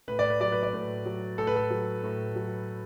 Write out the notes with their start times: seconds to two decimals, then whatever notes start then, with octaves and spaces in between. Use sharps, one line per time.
0.08 A2 B4
0.19 D5
0.30 B4
0.40 F#3 D5
0.52 B4
0.63 D5
0.73 A2 B4
1.06 F#3
1.38 A2 A4
1.47 B4
1.56 A4
1.71 F#3
2.03 A2
2.36 F#3